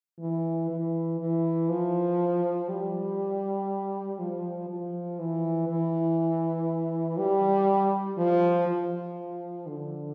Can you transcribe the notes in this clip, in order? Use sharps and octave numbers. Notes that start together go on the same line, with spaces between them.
E3
E3
E3
F3
G3
F3
F3
E3
E3
G3
F3
F3
D3